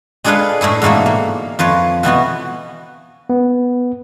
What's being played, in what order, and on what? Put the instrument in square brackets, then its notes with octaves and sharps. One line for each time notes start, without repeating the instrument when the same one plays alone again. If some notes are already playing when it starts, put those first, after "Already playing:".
[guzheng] G#3 D4 G#4 A4 B4 F5
A2 A3 E4 G#4
G#2 B2 E3 A3 A#3
A#3
F2 F3 B4 C#5
B2 E3 B3 F#4
[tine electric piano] B3